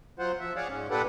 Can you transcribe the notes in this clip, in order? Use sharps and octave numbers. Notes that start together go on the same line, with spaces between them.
F#3 F4 C5 F#5
F3 E5
G#4 C#5 D5 F5 F#5
G#2 C#4
A#2 D4 G4 A4 B4 F#5